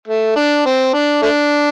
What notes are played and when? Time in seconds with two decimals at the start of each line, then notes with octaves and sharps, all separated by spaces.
0.08 A3
0.36 D4
0.65 C4
0.93 D4
1.22 A3 D4